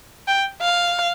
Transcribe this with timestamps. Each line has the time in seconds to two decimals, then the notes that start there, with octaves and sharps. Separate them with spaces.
0.28 G5
0.62 F5